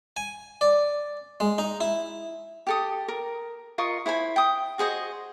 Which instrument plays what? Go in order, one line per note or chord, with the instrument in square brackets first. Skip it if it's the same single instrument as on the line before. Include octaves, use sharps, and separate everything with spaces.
[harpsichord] G#5
D5
G#3
D#4
E4
[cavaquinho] G4 A4 D#6
A#4
F4 A#4 D#5 C#6
E4 C5 G#5 B5
G5 D#6
F#4 G#4 C5 D#5